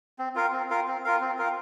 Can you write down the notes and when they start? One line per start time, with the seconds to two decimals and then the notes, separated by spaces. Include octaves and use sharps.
0.19 C4
0.35 F4 A#4 F5
0.52 C4
0.70 F4 A#4 F5
0.87 C4
1.04 F4 A#4 F5
1.21 C4
1.38 F4 A#4 F5